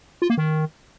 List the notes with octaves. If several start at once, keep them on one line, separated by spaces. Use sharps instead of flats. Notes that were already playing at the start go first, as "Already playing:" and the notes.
F4
A#3
D#3